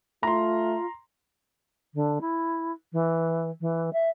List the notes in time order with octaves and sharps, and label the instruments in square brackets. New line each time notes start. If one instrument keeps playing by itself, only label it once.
[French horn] A3 [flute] F4 [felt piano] A#5 C6
[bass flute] D3
E4
E3
E3
E5